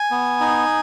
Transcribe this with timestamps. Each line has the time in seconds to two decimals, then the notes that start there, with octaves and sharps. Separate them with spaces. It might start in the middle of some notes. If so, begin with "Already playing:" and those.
Already playing: G#5
0.11 B3
0.40 D#4